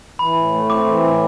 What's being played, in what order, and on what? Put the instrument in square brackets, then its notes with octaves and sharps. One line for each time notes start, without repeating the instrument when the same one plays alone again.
[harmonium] E3 [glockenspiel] B5
[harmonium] A2
A3
[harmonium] C4 [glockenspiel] D6
[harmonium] E3
A2